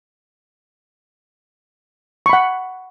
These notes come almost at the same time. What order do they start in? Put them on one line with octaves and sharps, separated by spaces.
C#6 B5 F#5